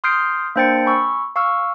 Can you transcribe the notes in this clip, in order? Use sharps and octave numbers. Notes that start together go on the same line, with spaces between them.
C6 D#6 F6 G6 C7 D7
A#3 D4 C5 G5 A6 C#7
G#5 B5 C#6 E6
F5 C#6 E6 F6